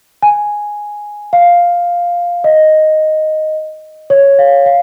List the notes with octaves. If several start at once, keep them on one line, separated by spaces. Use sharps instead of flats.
G#5
F5
D#5
C#5
F5
F5